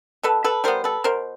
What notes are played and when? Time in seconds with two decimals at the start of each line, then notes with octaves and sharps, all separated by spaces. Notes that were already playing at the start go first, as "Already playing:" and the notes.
0.23 B2 A4 B4
0.44 A4 B4
0.64 G3 B3 A#4 C5
0.84 A4 B4
1.04 B2 A#4 C5